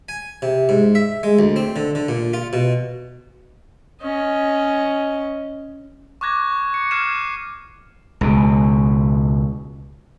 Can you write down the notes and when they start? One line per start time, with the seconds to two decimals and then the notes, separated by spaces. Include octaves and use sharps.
0.09 G#5
0.42 C3
0.69 G#2
0.95 E5
1.23 G#3
1.39 D2
1.56 C4
1.76 D3
1.95 D3
2.09 A#2
2.34 F4
2.53 B2
4.02 C#4 D#5
6.21 C#6 D6 F#6 G#6 A#6
6.74 C#7
6.91 F6 F#6 G#6 C7 D#7 E7
8.21 C#2 B2